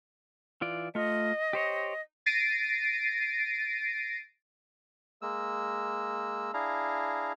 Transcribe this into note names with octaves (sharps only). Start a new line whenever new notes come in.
E3 F4 D5
A3 F4 D#5
G4 C5 C#5
A6 A#6 C7 D7 D#7
G#3 A#3 E6
D4 E4 G#4 F5 A#5